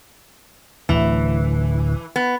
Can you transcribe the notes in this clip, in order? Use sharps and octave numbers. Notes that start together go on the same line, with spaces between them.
D1 D2 E3
B3